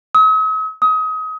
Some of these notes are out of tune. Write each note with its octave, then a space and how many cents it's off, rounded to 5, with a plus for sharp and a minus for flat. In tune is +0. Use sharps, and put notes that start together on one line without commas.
D#6 +45
D#6 +30